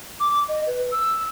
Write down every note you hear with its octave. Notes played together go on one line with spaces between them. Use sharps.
D6
D#5
B4
E6